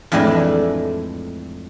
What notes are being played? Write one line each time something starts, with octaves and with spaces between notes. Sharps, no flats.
F2 A2 E3 G#3 D4 G#5